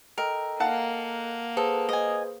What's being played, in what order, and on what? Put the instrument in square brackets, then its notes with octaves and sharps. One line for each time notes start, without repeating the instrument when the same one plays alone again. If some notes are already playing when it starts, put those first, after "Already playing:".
[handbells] A4 D#5 G5 [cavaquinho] A#4
[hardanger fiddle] A#3 [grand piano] F5 F#5 A5
[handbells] G#4 B4 C5 [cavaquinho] A4
[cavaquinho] D#5 G#5